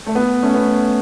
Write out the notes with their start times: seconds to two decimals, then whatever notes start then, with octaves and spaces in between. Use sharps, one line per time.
0.06 A3
0.15 B3
0.43 A3 C#4
0.54 B3